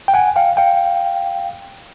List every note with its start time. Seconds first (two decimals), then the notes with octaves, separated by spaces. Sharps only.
0.08 G5
0.14 F#5 G#5
0.36 F5 G5
0.57 F5 G5